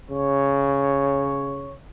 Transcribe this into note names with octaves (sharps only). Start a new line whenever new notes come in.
C#3 C#5